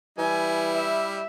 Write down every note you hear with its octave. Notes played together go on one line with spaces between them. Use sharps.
E3 G3 E4 G#5
E5